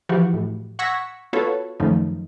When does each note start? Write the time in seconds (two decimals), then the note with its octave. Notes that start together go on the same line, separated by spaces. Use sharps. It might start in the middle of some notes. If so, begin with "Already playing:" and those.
0.09 E3 F3 F#4 G4
0.34 A2
0.79 F#5 C#6 E6 G#6 A#6 B6
1.33 B3 F4 F#4 A4 B4 C#5
1.80 F#2 D#3 F3 A3 D#4